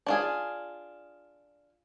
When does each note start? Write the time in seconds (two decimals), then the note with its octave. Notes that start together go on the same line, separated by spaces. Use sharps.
0.07 D4 F4 G#4